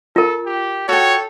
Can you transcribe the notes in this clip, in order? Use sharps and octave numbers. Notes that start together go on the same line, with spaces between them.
F4 A4 A#4
G4
F#4 A4 C#5 G5